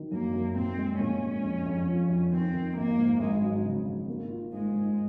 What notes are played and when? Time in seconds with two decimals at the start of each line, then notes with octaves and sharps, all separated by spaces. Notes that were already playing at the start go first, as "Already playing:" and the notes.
Already playing: D#3 F#3
0.11 F#2 A#3
0.33 F#2
0.55 A#2 C4
0.78 G#3
1.00 A#2 C#4
1.22 G#3
1.43 F2
1.66 F2
1.88 F3
2.09 F2
2.32 D#3 C4
2.53 D#3
2.76 G#1 A#3
2.97 G#2
3.19 G#1 G#3
3.42 F#3
3.64 C#3
3.85 G#1
4.08 A#3
4.30 F4
4.52 G#2 G#3
4.74 G#2